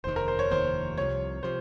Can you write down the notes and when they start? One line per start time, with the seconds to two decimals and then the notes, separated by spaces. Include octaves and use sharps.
0.04 F1 D#2 D#3 C5
0.16 A#4
0.28 C5
0.39 C#5
0.50 F1 D#2 D#3 C5
0.97 C2 C3 F3 C#5
1.43 C3 F3 C5